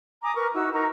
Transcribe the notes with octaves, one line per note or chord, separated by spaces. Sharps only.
G#5 A#5 D6 D#6
A#4 B4 C#6 F6
D#4 E4 F#4 E6
D#4 A#4 A#5 C#6